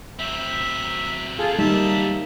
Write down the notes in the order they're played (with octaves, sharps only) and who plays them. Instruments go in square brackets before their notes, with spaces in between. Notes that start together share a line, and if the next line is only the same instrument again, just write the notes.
[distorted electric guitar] F#3 C4 [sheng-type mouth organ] E5
[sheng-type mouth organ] F4 G#4 A4
[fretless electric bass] G3 [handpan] A#3 D#4 [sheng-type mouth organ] E5 A5